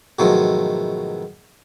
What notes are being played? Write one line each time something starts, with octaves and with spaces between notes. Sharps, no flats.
G#2 B2 D#3 F3 F#3 A3